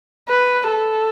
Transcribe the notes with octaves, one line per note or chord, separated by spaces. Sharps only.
B4
A4